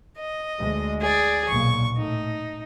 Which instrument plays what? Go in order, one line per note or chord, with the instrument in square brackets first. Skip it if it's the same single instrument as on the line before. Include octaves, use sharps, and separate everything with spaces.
[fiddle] D#5
[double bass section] D2 G#3
[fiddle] G#4 D5
[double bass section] B1 A#2 A#3 [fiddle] C#6
[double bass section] A2 [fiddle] D#4